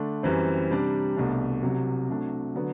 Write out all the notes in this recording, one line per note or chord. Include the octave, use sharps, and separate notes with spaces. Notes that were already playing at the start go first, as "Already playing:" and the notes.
Already playing: D3 A3 D4
F#2 E3 G3 C4
C3 G3 D4
C2 B2 A3 D4
C2 C3 F#3
C3 F#3 A3 D4
D3 F#3 B3